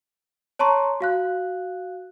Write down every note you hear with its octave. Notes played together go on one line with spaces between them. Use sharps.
C#5 A5 A#5 C6 C#6
F#4 F5 F#6